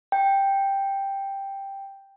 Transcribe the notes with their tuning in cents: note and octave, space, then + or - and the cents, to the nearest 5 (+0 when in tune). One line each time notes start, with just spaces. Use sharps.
G5 +5